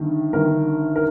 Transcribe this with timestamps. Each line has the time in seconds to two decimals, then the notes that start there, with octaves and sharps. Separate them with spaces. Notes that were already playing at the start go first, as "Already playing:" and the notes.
Already playing: G1 G2 D#3
0.33 G1 G2 D#3 A#4
0.96 A#4